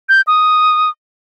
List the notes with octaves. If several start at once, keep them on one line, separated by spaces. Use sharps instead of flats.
G6
D#6